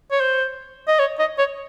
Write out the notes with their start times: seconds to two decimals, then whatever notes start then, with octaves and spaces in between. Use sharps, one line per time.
0.12 C#5
0.21 C5
0.88 D#5
0.99 C#5
1.19 D#5
1.38 C#5